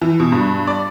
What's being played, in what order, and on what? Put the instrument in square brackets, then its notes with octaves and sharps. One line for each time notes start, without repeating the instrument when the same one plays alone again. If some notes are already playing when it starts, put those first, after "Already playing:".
[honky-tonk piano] E3
B2
G2
D5